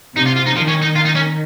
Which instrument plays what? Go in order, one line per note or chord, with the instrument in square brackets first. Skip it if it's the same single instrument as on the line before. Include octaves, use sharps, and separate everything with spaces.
[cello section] C3 [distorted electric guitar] D#4
[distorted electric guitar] F4
F4
D#4
[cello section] D#3 [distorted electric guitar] F3
[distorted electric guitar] C#4
D#4
F4
D#4
C#4